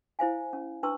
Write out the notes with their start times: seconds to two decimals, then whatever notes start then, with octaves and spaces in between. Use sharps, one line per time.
0.19 E4 C5 F5 G#5
0.53 C#4
0.83 D4 B4 A5 C6 C#6 E6